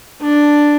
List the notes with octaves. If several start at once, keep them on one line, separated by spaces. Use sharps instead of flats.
D4